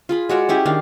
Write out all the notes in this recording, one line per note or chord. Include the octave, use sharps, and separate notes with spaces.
F4 G#4 B5
G#3 F#4 C#5 D5
C#4 E4 G4 G#4
D#3 D4 F5